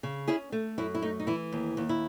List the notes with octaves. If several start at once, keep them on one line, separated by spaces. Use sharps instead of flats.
C#3
C#4 E4 G#4
A3
F#2 E4
E4
A3 D#4
D#4
E3 E4
D#2
D#2
E4